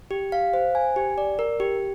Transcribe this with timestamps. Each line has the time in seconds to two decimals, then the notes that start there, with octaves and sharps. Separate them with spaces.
0.11 G4
0.32 F5
0.54 C5
0.75 G#5
0.96 G4
1.18 D5
1.39 A#4
1.60 G4